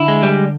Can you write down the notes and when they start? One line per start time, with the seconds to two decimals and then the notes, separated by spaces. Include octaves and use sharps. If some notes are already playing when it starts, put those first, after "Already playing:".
Already playing: D3 E4
0.08 G#3
0.23 G3